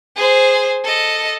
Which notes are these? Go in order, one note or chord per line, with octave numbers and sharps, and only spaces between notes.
G#4 C5
A4 D#5